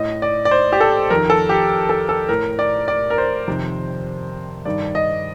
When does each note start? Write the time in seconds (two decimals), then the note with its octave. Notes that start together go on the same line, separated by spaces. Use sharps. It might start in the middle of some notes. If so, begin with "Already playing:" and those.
Already playing: A2 D#5
0.22 D5
0.45 D5
0.51 C5
0.72 G4
0.80 A4
1.10 F2 D#3 A#4
1.30 A4
1.49 G4
1.89 A4
2.09 A4
2.29 A2 A#4
2.59 D5
2.88 D5
3.10 A#4
3.18 C5
3.48 F2 C3 D#3
4.65 G2 D#3 D5
4.95 D#5